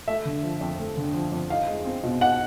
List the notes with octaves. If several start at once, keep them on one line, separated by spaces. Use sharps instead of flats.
A3 E5
D3
F3
F2
A3
D3
F3
F2
D#4 F5
G#3
C4
B2
D#4 F#5